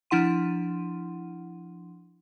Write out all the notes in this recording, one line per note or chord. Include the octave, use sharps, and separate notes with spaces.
F3 D4 E4 F#5 C6 D#7